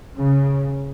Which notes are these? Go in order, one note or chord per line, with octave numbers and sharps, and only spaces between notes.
C#3